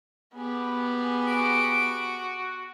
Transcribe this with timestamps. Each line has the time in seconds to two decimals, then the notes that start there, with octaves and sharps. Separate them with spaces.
0.36 B3 G4 G#4
1.28 F#4 D7